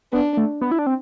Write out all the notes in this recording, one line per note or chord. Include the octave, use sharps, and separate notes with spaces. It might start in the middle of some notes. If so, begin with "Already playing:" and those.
B3 D4
A3
B3
E4
D4
C4